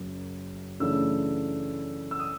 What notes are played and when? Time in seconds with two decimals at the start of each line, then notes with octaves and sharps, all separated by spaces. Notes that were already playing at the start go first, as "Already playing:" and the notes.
Already playing: F#1 F#2 F#3 A#3
0.80 F#2 C#3 E3 A3 D4 E6
2.11 E6
2.20 D#6